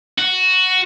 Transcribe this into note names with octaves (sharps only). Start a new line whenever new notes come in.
F#4